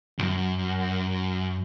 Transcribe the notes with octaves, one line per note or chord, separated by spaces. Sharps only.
C2 F#2